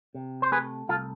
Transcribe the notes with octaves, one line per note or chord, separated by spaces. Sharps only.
C3
C5
A3 G#4 B4
C2 F4 A4